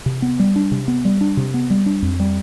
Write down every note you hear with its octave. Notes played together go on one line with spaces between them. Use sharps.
C3
B3
G3
D4
C3
B3
G3
D4
C3
B3
G3
D4
F2
G3